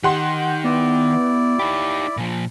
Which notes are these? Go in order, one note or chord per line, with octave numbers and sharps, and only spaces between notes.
D#3 G4 F#5 C6
G6
B3 E4 D5
D#4 G4 B5
A#2 F3